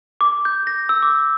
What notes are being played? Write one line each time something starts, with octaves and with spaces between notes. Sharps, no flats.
D6
G6
A#6
E6
D6